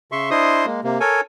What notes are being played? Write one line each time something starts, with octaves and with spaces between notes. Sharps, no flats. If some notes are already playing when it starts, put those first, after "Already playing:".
C#3 E5 C6 C#6
D4 E4 C5 D#5 C6 D#6
G#3 A#3
C3 A#3
A4 A#4 C#5 G#5